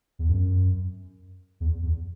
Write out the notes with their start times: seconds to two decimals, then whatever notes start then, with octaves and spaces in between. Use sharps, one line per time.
0.19 E2
0.29 F#2
1.60 E2
1.82 E2